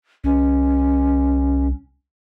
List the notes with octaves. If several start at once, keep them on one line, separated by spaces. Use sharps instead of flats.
C2 C#4